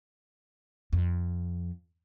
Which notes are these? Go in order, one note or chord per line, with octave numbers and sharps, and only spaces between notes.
F2